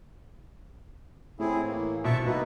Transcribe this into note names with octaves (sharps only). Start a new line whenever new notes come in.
A2 C4 E4 G#4
E3 A#3
C2 B2 E5 A5 C#6
A#3 D#4 F#4 B4